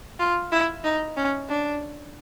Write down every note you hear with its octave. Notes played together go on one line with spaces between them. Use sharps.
F4
E4
D#4
C#4
D4